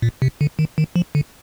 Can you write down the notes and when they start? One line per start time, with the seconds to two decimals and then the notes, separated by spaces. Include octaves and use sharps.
0.02 A#2
0.22 C3
0.41 D3
0.59 D#3
0.78 D#3
0.96 F3
1.15 D3